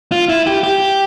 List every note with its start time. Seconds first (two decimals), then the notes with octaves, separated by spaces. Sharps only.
0.12 F4
0.29 E4
0.47 G4
0.63 G4